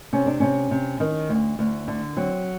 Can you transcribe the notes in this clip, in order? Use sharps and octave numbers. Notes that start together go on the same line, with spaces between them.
C3 C#4
D4
C3 C#4
C3
D#3
D2
D2
D3
F#3 C4